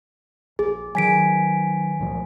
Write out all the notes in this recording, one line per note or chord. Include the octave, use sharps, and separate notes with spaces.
A#1 G#4
D#3 F#3 G#5 B6 D7
C#2 A#2 F3